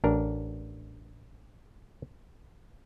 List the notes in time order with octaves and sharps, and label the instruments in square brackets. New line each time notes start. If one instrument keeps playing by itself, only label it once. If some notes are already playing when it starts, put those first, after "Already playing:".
[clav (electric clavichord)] A1 D4 A#4